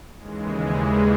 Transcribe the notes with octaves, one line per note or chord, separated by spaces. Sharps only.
D#2 C#3 E3 G#3
G3